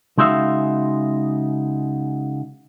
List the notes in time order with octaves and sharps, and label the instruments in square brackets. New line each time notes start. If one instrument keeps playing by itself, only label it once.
[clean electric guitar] C#3 G#3 D#4 F#4 E5 F5